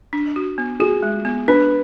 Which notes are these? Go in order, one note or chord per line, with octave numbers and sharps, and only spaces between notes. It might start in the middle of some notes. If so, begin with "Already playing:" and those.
D4
F#4
B3
F#4 G#4
G#3
B3
D4 B4